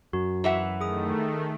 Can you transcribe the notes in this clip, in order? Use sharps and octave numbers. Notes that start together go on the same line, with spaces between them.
F#2 F#4
E3 E5 F#5
D#3 A3 G#4 D#6